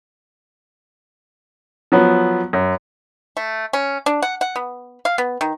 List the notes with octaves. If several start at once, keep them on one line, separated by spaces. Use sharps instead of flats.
F3 F#3 B3
F#2
A3
C#4
D4
F#5
F#5
B3
F5
B3
D#3